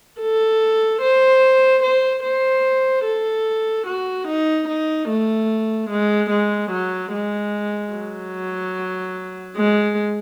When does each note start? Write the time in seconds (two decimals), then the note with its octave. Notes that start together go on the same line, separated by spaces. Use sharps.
0.20 A4
1.02 C5
1.83 C5
2.23 C5
3.05 A4
3.87 F#4
4.28 D#4
4.68 D#4
5.09 A3
5.90 G#3
6.30 G#3
6.71 F#3
7.13 G#3
7.93 F#3
9.56 G#3